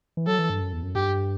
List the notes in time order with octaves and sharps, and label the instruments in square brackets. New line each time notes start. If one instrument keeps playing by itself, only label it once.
[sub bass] E3
[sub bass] F#3 [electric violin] A4
[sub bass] E3
G2
F#2
E2
F#2
[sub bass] G2 [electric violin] G4